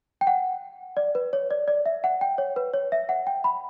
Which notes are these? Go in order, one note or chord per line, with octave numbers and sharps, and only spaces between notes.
G5
F#5
D5
B4
C#5
D5
D5
E5
F#5
G5
C#5
B4
C#5
E5
F#5
G5
B5